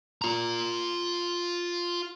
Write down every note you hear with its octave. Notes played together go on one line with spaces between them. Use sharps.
F4 A#5